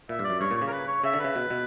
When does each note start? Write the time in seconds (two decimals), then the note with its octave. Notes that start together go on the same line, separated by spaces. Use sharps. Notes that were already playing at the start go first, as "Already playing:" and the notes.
0.09 A#2 E5
0.19 G2 D5
0.30 F#2
0.40 G2 C#5
0.51 A#2
0.56 C#5
0.62 C#3
0.67 A#4
0.72 B4
0.87 C#5
1.04 C#3 E5
1.13 D3
1.19 C#3 B4
1.36 B2
1.50 B2